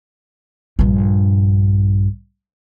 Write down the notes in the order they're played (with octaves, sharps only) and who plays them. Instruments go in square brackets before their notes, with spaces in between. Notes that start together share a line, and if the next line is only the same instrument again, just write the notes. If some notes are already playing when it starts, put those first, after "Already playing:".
[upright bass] A#1 G2